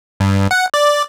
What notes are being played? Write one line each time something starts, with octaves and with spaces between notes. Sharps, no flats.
G2
F#5
D5